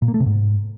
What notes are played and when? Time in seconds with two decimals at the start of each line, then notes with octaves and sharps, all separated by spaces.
0.02 A#2
0.08 A#3
0.14 A3
0.20 C3
0.26 G#2